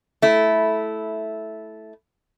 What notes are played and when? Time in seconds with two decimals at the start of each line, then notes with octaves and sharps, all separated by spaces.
0.22 A3 E4